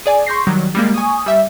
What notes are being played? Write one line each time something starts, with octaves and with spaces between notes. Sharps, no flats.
G#4 D5 G#5
C6 C#6 G6 A#6 C7
D#3 F#3 G3
G3 G#3 A#3
G#5 C#6 D#6
G3 E5